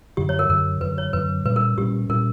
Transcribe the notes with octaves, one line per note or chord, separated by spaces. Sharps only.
F#2 D3 F#3 G4
C#5
A#4
F#2 D3 F#3 A#4
F#2 D3 F#3 B4
C#5
F#2 D3 F#3 B4
A#2 G3 C#4 B4
A#4
A#2 G3 C#4 G4
A#2 G3 C#4 A#4